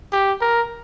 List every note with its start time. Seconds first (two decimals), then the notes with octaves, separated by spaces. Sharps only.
0.12 G4
0.41 A#4